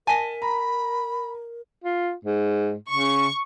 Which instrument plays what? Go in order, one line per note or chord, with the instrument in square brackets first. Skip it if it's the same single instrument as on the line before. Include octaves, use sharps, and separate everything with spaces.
[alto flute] A#4 [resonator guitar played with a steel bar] D#5 G#5 [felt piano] A5 B6
[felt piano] A#5 [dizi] B5
[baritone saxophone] F4
G#2
[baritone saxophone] C#3 [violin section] C#6